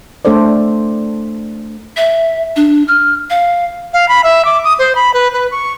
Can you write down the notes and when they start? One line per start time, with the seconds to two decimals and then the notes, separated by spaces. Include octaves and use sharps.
0.25 A3 D4 A4 C5 D5
1.97 E5
2.56 D4
2.88 F6
3.30 F5
3.93 F5
4.08 B5
4.24 E5
4.45 D6
4.64 D#6
4.79 C5
4.95 B5
5.14 B4
5.33 B4
5.51 C#6